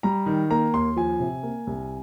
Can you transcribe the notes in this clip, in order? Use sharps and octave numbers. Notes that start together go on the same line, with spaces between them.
G3 A#5
D#3
A#3 A#5
D#2 C6
F3 G#5
C3
A#3
C2